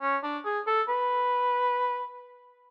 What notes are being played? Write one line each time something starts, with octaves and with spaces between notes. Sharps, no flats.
C#4
D4
G#4
A4
B4